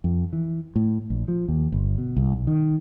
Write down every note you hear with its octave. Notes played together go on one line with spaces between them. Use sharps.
F2
E3
A2
A#1
F3
D#2
G1
B2
C2
B1
D#3